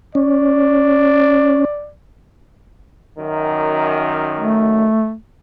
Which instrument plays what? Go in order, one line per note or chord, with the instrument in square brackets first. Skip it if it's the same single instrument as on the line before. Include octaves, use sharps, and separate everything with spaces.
[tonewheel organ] C#4 [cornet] D5
[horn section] F#2 D#3
[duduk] A3